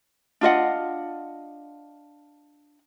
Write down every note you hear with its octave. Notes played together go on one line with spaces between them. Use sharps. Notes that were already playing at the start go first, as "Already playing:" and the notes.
D4 F4 D#5 F#5